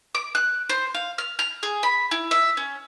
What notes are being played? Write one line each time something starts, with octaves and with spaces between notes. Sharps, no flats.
D6
F#6
C5
F5
F6
F6
G#4
B5
E4
E5
C#4